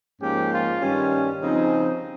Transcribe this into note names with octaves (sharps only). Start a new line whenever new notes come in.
G#2 F3 A#3 C#4 G4
F4
G2 D#3 G3 C#4
C#3 F3 C4 D#4